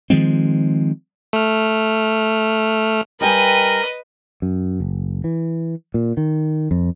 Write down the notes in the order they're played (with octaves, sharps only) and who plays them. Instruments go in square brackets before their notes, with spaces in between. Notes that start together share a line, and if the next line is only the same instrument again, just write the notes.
[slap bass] D#3 F3 G#3 C4
[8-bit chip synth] A3 F6
[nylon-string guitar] G3 G5 G#5 [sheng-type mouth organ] A#4 [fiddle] B4 D#5
[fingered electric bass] F#2
F#1
E3
A#2
D#3
F2